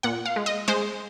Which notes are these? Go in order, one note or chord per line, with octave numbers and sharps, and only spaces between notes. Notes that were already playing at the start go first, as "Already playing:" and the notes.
A#2 F#5
F5
G#3
D#5
G#3 C5